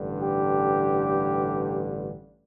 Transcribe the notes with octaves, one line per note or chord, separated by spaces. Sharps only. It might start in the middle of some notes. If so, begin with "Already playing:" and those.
Already playing: A1 G2 D3
G4